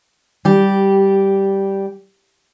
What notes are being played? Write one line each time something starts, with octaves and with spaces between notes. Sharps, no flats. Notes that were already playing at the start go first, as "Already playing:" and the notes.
G3 G4